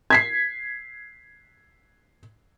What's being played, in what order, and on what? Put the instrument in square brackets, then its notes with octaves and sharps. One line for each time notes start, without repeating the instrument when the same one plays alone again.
[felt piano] G#6 B6 C7